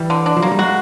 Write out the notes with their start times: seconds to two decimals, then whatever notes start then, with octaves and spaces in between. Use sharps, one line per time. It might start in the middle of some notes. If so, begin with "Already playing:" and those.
Already playing: E3 G3
0.10 D3
0.26 D4
0.37 F3
0.42 F#3 A#3
0.52 G3
0.59 G#3 F#4